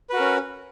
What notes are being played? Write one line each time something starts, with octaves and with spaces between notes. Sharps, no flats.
C#4 F#4 A#4 B4